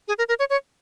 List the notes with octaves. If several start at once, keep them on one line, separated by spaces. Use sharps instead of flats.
G#4
A#4
A#4
C#5
C#5